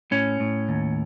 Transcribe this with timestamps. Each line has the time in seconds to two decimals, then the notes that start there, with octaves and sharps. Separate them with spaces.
0.11 A2 C#4
0.40 A2
0.69 D#2